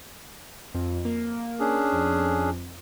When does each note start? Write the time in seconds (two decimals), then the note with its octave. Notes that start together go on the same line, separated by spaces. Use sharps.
0.74 F2
1.05 A#3
1.60 C#4 D4 G#4
1.93 F2